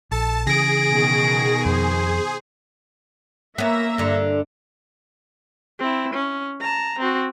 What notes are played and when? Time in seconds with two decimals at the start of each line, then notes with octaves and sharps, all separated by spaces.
0.11 A#1 A4 A5
0.47 C#3 E3 G#4 A#6 D7
0.87 B2 D#3
1.65 F2 C5
3.58 A#3 B3 C#4 E5 A#5
3.98 G2 D3
5.79 C4 E4
6.14 C#4
6.60 A5 A#5
6.99 C4 F#4